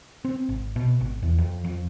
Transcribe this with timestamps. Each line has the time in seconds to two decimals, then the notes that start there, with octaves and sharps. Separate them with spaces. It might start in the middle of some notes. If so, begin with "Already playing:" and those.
0.25 C4
0.49 G#1
0.76 B2
1.01 G#1
1.22 E2
1.38 F2
1.64 F2